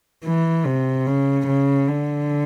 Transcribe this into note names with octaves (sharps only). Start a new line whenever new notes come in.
E3
C3
C#3
C#3
D3